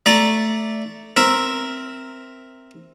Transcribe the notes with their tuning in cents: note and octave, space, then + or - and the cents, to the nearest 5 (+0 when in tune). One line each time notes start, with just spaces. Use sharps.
A3 +0 D5 -10 A#5 +0
C4 +0 A#4 +0 E5 +0